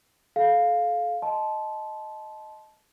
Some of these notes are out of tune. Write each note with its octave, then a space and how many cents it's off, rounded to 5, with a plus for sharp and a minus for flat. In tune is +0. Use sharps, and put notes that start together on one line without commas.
A4 -35 F5 +5
D#5 +0 A5 -20 C6 -5